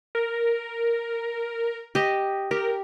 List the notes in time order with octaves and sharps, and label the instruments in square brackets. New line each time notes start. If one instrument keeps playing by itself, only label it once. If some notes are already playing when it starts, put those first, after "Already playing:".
[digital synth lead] A#4
[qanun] G4 D#5
[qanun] G4 [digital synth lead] A#4